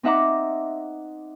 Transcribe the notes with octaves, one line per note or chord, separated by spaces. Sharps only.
C4 D#4 E5 F#5 A#5 D6